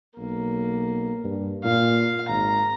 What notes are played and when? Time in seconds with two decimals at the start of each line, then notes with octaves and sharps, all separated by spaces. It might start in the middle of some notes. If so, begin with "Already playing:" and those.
0.18 B1 A#3
1.24 G2
1.64 A#2 F5
2.28 G#1 A#5